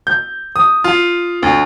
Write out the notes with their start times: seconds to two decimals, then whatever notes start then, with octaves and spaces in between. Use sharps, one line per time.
0.07 G6
0.56 D#6
0.84 F4
1.43 D2